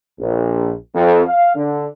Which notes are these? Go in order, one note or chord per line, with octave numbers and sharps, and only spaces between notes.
A#1
F2
F5
D3